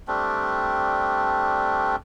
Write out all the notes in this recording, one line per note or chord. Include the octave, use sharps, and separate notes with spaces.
G3 A3 C4 D4